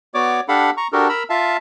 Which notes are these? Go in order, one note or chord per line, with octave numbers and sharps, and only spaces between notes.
B3 F#4 C#5 D5 D6
D4 G4 A4 F5 F#5 B5
A#5 C#6
D4 F#4 G4 A4 A#4
A#4 A#5 B5 E6
F4 E5 F5 A5